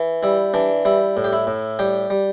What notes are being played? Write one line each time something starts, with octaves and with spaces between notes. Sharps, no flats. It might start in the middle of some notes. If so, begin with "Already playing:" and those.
Already playing: E3
G3 E4
E3 D4
G3 E4
A2
G4
E4
A2
G3 G4
G3